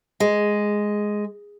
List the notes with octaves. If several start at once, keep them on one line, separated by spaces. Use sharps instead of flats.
G#3